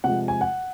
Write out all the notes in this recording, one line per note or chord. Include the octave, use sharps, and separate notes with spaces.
C3 F3 G#3 F#5
G#5
F#5